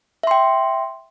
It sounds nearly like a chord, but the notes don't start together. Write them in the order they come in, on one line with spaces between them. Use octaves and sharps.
E5 C6 G5